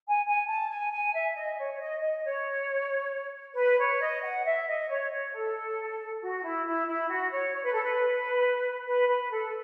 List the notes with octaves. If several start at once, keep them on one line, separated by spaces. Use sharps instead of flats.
G#5
G#5
A5
G#5
G#5
E5
D#5
C#5
C#5
D#5
D#5
C#5
B4
C#5
D#5
F#5
E5
D#5
C#5
C#5
A4
F#4
E4
E4
E4
F#4
C#5
C#5
B4
A4
B4
B4
B4
A4